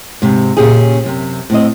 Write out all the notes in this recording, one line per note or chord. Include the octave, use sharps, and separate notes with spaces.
G#2 C3
A#2 C#3 C#4 G4 G#4
F#2 C3
A2 C4 D#5